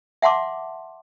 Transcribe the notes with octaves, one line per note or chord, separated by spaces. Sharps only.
E5 F#5 A5 C6 D6